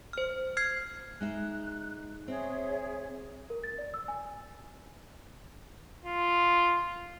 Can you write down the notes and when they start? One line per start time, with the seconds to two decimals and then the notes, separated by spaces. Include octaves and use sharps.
0.13 C5 F6
0.57 F6 G#6 C7
1.20 G#3 D#4 E5 F#6
2.28 C4 G#4 C#5 E5
3.50 A#4
3.64 A6
3.78 D5
3.94 E6
4.08 G#5
6.04 F4